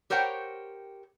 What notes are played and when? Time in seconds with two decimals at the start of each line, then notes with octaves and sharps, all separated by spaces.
0.10 G4 A#4 C5 C#5 F#5 G5